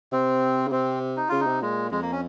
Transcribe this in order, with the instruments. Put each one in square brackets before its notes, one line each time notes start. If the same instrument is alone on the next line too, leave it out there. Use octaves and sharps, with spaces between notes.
[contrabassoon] C3 [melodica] C4
[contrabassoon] C#3
[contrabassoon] C3 [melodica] C4
[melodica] D#4
[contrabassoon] C#3 [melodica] F4
[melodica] D#4
[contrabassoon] C3
[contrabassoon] A#2 [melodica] G#3
[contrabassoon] F2 [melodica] G#3
[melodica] A#3
C#4